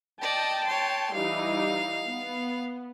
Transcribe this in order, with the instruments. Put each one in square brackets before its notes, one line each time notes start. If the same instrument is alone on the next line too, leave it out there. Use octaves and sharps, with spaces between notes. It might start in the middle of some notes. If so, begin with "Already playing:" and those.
[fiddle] D5 D#5 [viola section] G5 A5
[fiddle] C#5 C6
[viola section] E3 G3 D#4 [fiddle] F5
[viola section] B3